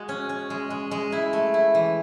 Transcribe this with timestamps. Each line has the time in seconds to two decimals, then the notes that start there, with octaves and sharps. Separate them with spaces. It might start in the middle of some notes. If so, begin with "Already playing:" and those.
Already playing: G#3 F#4
0.09 C#4
0.29 C#4
0.50 G#3
0.70 G#3
0.91 G#3
1.12 E4
1.33 A3
1.54 E4
1.75 E3